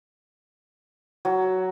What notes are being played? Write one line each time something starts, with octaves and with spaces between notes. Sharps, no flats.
F#3